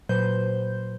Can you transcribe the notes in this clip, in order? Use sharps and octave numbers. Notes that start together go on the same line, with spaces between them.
A#2 F#3 B4 C5 G6